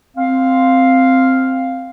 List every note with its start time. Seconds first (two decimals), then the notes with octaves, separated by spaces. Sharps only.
0.17 C4 F5